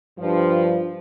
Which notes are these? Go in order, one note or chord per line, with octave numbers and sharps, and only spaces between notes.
G2 F3